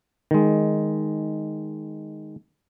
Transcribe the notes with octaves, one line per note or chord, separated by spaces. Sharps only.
D#3 G#3